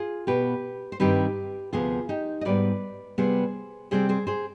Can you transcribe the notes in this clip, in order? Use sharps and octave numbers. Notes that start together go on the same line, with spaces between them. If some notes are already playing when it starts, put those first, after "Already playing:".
Already playing: F4 G#4
B2 B3 G4 B4
C5
G2 D#3 G3 C4 G4 B4
D2 C3 F3 B3 F4 G#4
D#4 G4
D#5
G#2 G3 B3 B4 D5
C3 G3 B3 G#4 C5
C3 G3 C4 G#4 C5
G#4 C5
G#4 C5